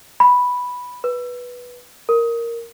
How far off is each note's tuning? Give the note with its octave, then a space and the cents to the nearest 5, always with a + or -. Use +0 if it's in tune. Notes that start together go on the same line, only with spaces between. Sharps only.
B5 -5
B4 -10
A#4 -5